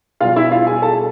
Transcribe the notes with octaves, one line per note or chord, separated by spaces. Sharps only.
B2 G3 F4 F5
E4 E5
F4 F5
G#4 G#5
A4 A5